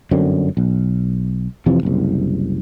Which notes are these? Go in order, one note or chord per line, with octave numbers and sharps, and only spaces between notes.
G1 F#2 D3 C4
B1
F2 C3 E3 F3
F#1 C2